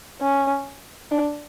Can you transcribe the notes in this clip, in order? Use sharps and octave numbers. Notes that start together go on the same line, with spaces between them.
C#4
D4